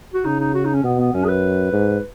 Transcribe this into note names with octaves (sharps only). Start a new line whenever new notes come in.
F#4
C#3 D#4
D#4
F#4
D#4
C#4
B2 B3
B3
F#2 C#4
G#4
B4
G#2